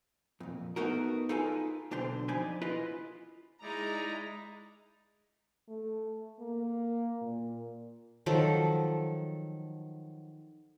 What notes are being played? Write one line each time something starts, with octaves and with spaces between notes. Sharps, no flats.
F2 A#2
A3 B3 D#4 F#4 A#4
D#4 F4 A4 B4 G5 G#5
B1 D3 D4 C5
F2 D#4 C5 D5 G#5 B5
E4 F4 B4 D#5
G#3 D#4 E4 D5 A#5
A3
A#3
A#2
D#3 F3 F#3 A4